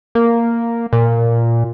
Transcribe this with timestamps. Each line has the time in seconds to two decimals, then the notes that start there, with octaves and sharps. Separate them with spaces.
0.15 A#3
0.93 A#2